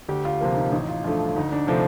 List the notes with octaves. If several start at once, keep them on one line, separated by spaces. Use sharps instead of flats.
D2 G4
F4
C3 F3 A#3
D#4
A1 D#4
F4
G2 F3 A3 F4
D2 D#4
D4
C3 F3 A3 C4